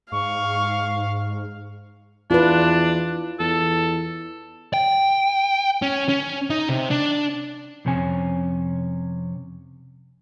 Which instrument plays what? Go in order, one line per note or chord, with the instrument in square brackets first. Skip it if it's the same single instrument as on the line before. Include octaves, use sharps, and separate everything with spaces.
[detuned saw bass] G#2 [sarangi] F5 [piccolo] C#6
[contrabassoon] E2 [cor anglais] D4 [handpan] F4 B4
[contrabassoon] E2 [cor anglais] A4
[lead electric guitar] G5
C#4
C#4
D#4
C3
D4
[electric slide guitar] F2 C3 C#4 G#5